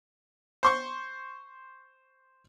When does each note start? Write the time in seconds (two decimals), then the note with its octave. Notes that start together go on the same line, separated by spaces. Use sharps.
0.63 C5 C6 C#6